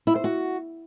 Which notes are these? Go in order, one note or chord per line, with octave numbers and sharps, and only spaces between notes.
E4
C5
F#4